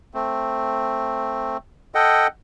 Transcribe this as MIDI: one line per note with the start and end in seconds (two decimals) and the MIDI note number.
0.14 1.57 57
0.14 1.57 60
1.95 2.27 69
1.95 2.27 75
1.95 2.27 78
1.95 2.27 79